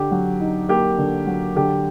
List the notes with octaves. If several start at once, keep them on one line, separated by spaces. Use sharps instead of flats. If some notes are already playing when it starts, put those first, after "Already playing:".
Already playing: D3 G4
F#3
D#4
A#3 G4
D3
F#3
D3 G4